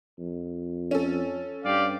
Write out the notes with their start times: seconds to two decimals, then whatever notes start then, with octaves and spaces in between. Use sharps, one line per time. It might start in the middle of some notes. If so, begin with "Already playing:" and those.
0.19 F2
0.91 C#4 A4
1.65 G2 G4 D5 F5